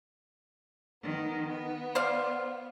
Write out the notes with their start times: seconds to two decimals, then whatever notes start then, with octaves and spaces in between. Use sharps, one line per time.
1.04 D#3 B3
1.48 B3
1.95 C5 D5 F5